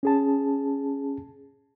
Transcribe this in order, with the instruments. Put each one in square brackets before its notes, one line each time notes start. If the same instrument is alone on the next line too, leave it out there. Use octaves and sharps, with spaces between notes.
[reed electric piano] C#4 G#4 A5